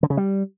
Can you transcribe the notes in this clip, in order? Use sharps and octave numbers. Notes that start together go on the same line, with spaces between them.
D3
C#3
G3